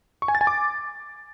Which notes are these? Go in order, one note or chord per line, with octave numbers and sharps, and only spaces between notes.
C#6
G#5
A6
G#5
D6